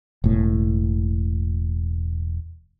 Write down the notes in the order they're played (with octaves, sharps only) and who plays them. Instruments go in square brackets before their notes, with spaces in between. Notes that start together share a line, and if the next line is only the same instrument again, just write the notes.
[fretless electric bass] E1 A2